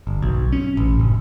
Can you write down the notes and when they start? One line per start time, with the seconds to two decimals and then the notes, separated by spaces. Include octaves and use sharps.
0.07 G1
0.22 B1
0.53 C#4
0.77 A1
1.00 F#1